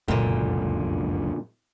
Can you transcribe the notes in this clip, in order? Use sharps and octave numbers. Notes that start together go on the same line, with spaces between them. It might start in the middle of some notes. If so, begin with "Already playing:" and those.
F1 C#2 F#2 A#2 D3